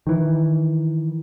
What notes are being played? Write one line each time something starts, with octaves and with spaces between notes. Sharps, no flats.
D#3 E3